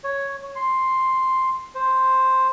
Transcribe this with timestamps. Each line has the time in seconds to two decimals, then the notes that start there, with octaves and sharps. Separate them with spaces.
0.04 C#5
0.56 C6
1.75 C5